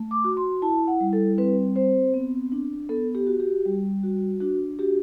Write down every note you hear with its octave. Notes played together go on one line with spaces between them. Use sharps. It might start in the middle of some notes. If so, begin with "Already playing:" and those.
Already playing: A3
D6
F#4
C6
E4 A5
F#5
G3
A4
C4 B4
C4 C5
B3
D4
B3 A4
G4
F#4
G4
G3
F#4
D4 F#4
F#4 G4